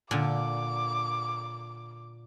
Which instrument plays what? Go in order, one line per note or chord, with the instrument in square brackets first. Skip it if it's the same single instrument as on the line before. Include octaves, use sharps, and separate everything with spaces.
[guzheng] A#2 D3 [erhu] D6